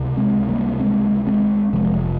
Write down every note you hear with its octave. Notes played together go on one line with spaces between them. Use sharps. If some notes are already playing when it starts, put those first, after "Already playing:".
Already playing: C#2 C3
G#3 C4
G3 A#3
G#3 C4
G#3 C4
F1 F2 C3 F3 G#3